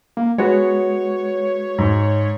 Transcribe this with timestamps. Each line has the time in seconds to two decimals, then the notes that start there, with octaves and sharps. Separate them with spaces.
0.17 A#3
0.38 G#3 B3 F#4 C#5
1.78 G#2